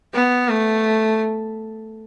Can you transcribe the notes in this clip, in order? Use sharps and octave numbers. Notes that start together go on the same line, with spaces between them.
B3
A3